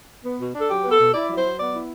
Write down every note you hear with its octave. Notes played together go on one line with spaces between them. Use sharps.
B3
B2
D4
A4
F#3 G4
B3 B4
A4
B2
E4 D5
F#3
C5
F#3
B3 D5
E4